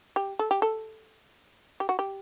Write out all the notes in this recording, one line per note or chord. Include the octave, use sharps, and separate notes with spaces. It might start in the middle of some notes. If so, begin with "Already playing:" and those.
G4
A4
G4
A4
G4
F#4
G4